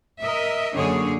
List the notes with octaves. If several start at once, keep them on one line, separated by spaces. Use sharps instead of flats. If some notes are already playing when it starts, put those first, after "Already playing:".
A#4 D#5 E5
F#2 D3 A#3 D4 G#4 C#5